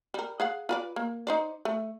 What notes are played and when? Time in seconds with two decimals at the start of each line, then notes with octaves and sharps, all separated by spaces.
0.14 G3 A#4
0.40 G#4 F5 F#5
0.69 F4 B4 D5
0.96 A#3
1.27 D#4 C5 D5
1.65 A3